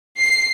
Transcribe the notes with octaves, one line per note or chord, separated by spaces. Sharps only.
C7